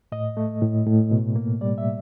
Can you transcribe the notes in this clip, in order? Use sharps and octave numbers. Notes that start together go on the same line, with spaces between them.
A2 D#5
A3
A2
A2
B2
A#3
G3 D5
E5